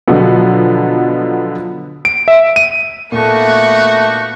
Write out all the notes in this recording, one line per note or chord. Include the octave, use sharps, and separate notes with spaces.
B2 D3 F3 F#3 B3
D7
E5
D#7
A#2 A3 B3 D4 D#4 F#4 C#6